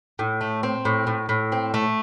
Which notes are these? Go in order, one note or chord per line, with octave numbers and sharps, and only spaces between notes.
A2
A3
C4
A2
A2
A2
C4
A3